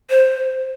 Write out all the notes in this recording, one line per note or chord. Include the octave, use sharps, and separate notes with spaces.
C5